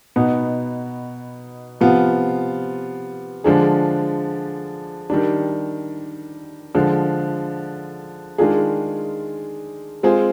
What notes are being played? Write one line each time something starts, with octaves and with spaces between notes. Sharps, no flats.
B2 B3 D#4
C3 F3 B3 F4
D3 F3 G#3 D4 G#4
D#3 G3 D4
D3 F3 G#3
D#3 G#3 D4 F4 G#4
G#3 C4 F4 G#4